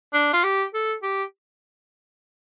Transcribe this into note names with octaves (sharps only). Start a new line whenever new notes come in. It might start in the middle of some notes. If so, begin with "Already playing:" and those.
D4
F4
G4
A4
G4